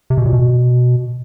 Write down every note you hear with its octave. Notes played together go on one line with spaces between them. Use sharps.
C3
B2
A#2
B2